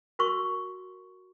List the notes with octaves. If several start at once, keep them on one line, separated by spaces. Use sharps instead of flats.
F#4 A#4 C6 C#6